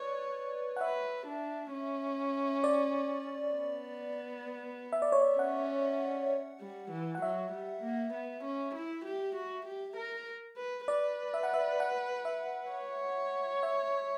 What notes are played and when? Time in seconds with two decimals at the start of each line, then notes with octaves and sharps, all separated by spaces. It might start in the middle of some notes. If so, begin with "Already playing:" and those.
Already playing: B4 C#5 D5
0.76 F#5
0.80 B4 E5
1.27 D4
1.72 C#4
2.64 D5
3.55 B3
4.93 E5
5.02 D5
5.12 C#5
5.22 D5
5.38 C#4 F#5
6.61 G3
6.91 E3
7.15 F#5
7.21 F#3 E5
7.52 G3
7.83 A#3
8.13 B3
8.44 C#4
8.75 E4
9.05 G4
9.35 F#4
9.65 G4
9.97 A#4
10.57 B4
10.88 B4 D5
11.34 E5
11.43 F#5
11.54 E5
11.80 F#5
12.25 E5
12.71 C#5
13.63 E5